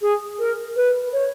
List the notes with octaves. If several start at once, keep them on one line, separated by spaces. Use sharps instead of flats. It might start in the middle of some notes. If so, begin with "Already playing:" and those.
G#4
A#4
B4
C#5